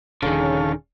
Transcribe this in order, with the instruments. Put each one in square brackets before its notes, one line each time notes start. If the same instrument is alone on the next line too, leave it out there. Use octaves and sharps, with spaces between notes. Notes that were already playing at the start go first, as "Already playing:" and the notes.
[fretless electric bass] D#1 [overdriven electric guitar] D3 D#3 [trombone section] C#4 G#4 [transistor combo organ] A4 C#5 F5